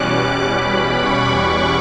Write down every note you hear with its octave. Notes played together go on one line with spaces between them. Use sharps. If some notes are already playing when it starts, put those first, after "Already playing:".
Already playing: E2 B2 G3 C#4 D6 F#6
B5
C#6
D6